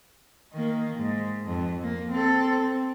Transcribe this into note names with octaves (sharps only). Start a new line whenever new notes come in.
D#3 A#3
G#2
F2
A#3
C4 A4
C4